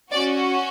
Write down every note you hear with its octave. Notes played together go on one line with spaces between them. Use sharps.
C#4 F#4 D5